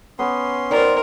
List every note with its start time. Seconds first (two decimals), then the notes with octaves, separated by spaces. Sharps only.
0.19 B3 C#4 C6
0.70 D#3 A#4 C5 D5